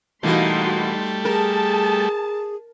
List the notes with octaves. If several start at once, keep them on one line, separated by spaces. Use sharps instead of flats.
B2 E3 G3 A3 A#3 D#4 F#4 C6
G#4 A#4 A5